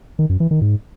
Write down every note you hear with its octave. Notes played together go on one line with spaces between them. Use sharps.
D#3
F#2
E3
D#3
G#2